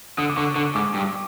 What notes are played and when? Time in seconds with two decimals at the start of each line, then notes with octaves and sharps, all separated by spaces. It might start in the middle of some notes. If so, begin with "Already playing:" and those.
0.18 D3 D#6
0.30 D6
0.37 D3 C#6
0.56 D3 C#6
0.75 G#2 D6
0.94 G2